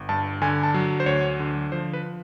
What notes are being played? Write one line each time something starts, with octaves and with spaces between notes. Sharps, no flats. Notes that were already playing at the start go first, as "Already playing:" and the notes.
Already playing: G1
G2 A5
D3 G#5
A5
F#3
C5
D2 C#5
D3
F3 C5
B4